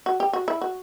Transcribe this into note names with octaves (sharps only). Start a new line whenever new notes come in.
F#4
G4
F#4
E4
F#4